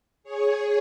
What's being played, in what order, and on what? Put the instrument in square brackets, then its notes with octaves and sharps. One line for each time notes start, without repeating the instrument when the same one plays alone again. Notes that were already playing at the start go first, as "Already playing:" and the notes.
[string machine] G#4 C#5